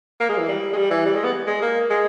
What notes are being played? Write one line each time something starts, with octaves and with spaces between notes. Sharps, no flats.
A#3
G#3
E3
G3
G#3
G3
E3
G3
G#3
B3
G#3
A#3
G#3